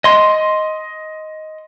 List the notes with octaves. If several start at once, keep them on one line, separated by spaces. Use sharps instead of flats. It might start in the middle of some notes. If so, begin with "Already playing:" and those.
D#5 C6